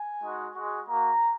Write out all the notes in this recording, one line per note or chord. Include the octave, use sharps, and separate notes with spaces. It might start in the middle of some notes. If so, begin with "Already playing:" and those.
Already playing: G#5
G#3 D#4 F#4
G#3 F#4
A#3 F#4 A#5